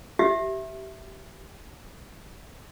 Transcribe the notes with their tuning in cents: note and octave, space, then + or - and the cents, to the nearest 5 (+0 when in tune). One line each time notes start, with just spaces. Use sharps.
G4 -30 E5 +0